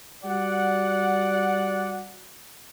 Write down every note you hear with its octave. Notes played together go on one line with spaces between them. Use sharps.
G3 F#4 D5 F#5